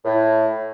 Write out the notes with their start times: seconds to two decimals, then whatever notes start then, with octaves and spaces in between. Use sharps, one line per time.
0.05 A2